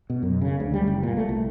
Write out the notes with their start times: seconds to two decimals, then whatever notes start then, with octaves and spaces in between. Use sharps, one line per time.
0.10 B2
0.23 F#2
0.41 C#3
0.60 D2
0.74 G3
0.87 F#1
1.03 A#2
1.17 A3
1.29 C2